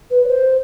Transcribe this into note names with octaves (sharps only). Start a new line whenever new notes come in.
B4
C#5
C5